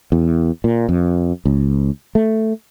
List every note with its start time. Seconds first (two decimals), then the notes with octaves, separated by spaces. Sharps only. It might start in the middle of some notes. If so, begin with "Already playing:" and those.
0.12 E2
0.64 A#2
0.89 F2
1.45 C#2
2.15 A3